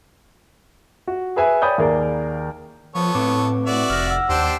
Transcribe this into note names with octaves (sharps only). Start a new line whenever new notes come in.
F#4
G#4 B4 E5 G#5
C#5 D5 G5 B5 D#6 G6
D#2 A#3 G#4 A#4 D5
F3 B3 A4 C#5
A2 C4 B4 D6
F#4 D5 E5
F1 F6 A#6
F#5 E6
D#2 D4 G4 C5 A5